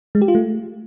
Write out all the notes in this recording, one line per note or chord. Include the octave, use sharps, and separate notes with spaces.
G#3
G4
F4
A3